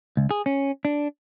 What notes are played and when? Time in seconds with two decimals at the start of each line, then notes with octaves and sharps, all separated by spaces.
0.17 C#2
0.31 G#4
0.46 C#4
0.85 D4